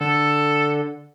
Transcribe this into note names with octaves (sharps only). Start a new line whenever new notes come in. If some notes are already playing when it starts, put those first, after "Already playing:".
D3 A4